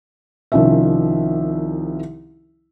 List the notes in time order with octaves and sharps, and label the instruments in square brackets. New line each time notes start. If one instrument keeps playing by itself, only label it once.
[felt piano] C2 D#3 F3 C#4 E5